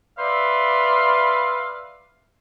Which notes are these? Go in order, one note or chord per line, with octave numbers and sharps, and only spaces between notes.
B4 D5 E5 F5 B5 C6